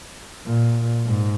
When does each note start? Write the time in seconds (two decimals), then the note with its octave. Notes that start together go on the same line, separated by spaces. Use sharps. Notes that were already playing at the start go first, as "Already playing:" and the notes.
0.45 A#2
1.07 G#2